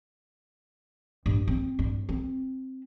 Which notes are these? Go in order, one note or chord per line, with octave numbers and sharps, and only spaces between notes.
G2
C4
G2
C4